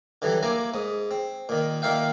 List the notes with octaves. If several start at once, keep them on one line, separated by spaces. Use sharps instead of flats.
D3 E3 F#3 G3
A#3 E4 G#5 A#5 D6
G#2 D#6
C4
A#2 D#3
A#2 D#3 A#3 E5 F5 G5